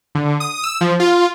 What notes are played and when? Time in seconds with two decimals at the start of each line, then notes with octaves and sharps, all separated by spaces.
0.15 D3
0.40 D#6
0.64 E6
0.81 F3
1.00 F4